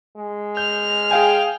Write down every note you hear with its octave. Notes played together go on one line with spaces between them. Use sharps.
G#3
F6 G6
G#4 F5 G5 G#5